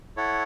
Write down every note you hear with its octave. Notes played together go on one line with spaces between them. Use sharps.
E4 A4 C#5 F#5